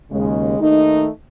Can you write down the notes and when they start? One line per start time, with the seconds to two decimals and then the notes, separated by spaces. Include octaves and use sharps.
0.10 D#2 C#3 G#3
0.59 D#2 D#3 A3 D#4